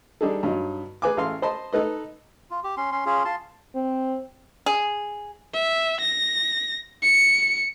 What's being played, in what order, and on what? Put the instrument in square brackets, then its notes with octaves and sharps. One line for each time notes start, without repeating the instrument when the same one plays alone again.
[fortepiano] G3 D4 D#4 G#4 A4
G2 F#3 D#4
G#4 B4 G#5 D6
A1 G#4 F5 C6
C5 D#5 A5 B5 C6
D#4 A4 B4 D#5
[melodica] F4
G4
C#4 C6
C#4 C6
C#4 F4 G#4
F4 A5 C6
[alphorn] C4
[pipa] G#4
[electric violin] E5
A#6
C#7